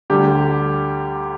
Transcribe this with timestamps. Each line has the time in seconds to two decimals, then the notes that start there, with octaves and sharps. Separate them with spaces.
0.10 D2 D3 G3 G4